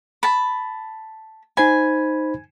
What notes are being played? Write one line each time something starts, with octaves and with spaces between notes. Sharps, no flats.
A5 B5
D#4 C5 G#5 B5